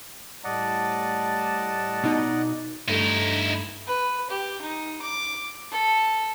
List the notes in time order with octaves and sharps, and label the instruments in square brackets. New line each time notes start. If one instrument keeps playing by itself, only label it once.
[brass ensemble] A2 G3 A5 [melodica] D5 D#5 F#5
[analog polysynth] B2 D#4
[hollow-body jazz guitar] G2 A3 [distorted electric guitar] D#4 E4
[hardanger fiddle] B4
G4
D#4
D6
A4